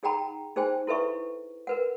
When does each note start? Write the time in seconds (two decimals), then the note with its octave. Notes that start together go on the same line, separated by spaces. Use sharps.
0.03 D#4 G#4 F#5 G5 A#5 B5
0.56 D#4 G#4 C5 G5 G#5
0.87 E4 A4 B4 E5 C#6
1.67 A#4 B4 F#5